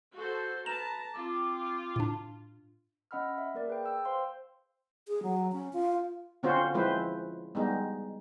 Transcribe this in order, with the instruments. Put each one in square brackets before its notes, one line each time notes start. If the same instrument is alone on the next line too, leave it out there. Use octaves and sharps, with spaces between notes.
[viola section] F#4 A4 C5
[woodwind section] B4 A#5 [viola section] A5 [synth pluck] E7
[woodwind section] C4 D6 [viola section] F4
[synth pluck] A2 D4
[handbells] C#4 D#5 F#5 B5 E6 F6
E5
A#3 A#4 D5
G#4 B4 G5
G5 E6
C5 F5 C6
[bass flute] G#4
F#3
C#4
F4
[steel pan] D3 C4 C#4 F4 F#4 C5
F3 G#3 C4 E4 B4 C5
G3 G#3 B3 D#4